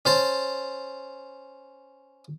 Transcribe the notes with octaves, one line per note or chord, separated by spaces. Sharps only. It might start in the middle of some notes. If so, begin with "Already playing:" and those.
C#4 C5 A5